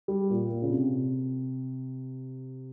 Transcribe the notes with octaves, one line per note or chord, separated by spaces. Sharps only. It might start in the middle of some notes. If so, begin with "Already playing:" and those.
G3
A#2
A#2
C#3
C3